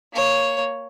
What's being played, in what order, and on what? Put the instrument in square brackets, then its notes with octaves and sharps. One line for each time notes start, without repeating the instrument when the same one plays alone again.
[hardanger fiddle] A#3 C#5